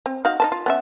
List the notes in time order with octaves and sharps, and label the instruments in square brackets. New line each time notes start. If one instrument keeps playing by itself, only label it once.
[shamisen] C4
D#4 F#4 F5
D#4 B4 A5
F4
B3 C#4 E5